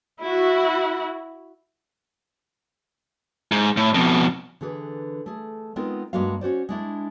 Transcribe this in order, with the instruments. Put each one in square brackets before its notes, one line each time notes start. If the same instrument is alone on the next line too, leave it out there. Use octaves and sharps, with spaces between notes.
[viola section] E4 F#4
[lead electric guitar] G#2
A2
F2 B2
[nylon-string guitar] D3 E3 G#4 B4
A3 G#4
G#3 B3 C4 D#4 F4 A#4
G2 G3 G#3 A#3 F#4 F5
C#4 F#4 C5 D5
G#3 D4 E4